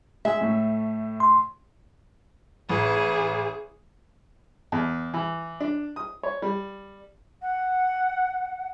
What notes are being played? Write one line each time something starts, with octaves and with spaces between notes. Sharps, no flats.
G#3 G#4 E5
A2 A3
C6
A1 G#4
E2
E3
D4
D#6
C#5
G3
F#5